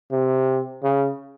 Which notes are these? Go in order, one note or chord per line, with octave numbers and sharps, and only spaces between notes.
C3
C#3